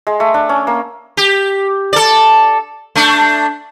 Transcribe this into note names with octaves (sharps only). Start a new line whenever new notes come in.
G#3
A3
D4
C#4
A#3
G4
A4 D5
A3 D4